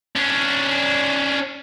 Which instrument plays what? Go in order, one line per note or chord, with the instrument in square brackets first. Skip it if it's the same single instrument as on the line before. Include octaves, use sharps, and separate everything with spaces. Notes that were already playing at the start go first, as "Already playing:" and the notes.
[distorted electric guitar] C#4 D4